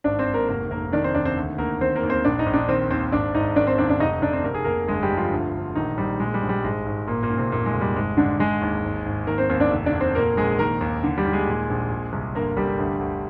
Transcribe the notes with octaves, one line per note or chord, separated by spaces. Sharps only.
G#1 D4 D5
C4 C5
G#1
A#3 A#4
F1 A#3 A#4
F1 A#3 A#4
D#3 D4 D5
C4 C5
D#2 D4 D5
C4 C5
D2
D2 A#3 A#4
D#3 C4 C5
A#3 A#4
D#2
C4 C5
A#1 D4 D5
D#4 D#5
A#1
D4 D5
D#3 C4 C5
D#2 C4 C5
G#1 D4 D5
G#1 D#4 D#5
D#3 D4 D5
C4 C5
D#2 D4 D5
D4 D5
F1 D#4 D#5
F1 D4 D5
C4 C5
F1 A#4
G#4
F1 A#3 A#4
G1 G#3 G#4
G3 G4
G1
F3 F4
D2
D2
A#1 D#3 D#4
A#1 G3
A#2 G#3
G3
A#1
G3
G#1 G#3
G#1
G#1 A#2 A#3
A#2 A#3
G#1
C3 C4
F1 A#2 A#3
G#3
F1
G3
G#1 G#3
G#1 D3 D4
D3 G#3 G#4
D#2
G#1
G#1
D#3 A#3 A#4
C4 C5
D#2 C4 C5
D4 D5
F1
D4 D5
F1
C4 C5
A#2 A#3 A#4
A#1 G#3 G#4
D#3 A#3 A#4
D#2
D3
G3 G4
D#2
G#3 G#4
A#2
A#1
A#2
C2
G1 A#3 A#4
G1 G3 G4
D2
D2